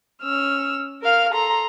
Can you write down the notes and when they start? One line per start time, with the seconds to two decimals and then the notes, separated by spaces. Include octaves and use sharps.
0.23 C#4 E6 F6
1.03 A#4 F5 F6
1.33 A4 A#5 C6